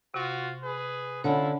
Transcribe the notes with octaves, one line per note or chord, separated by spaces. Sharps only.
C3 F4 F#4
G#4 B4
D3 C#4 E4 F4 C#5 A5 B5